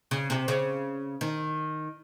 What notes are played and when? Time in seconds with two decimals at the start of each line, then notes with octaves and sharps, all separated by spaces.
0.11 C#3
0.30 C3
0.48 C#3
1.21 D#3